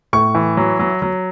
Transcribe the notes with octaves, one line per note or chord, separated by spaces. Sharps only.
A2 C#6
E3
F#3
F#3
F#3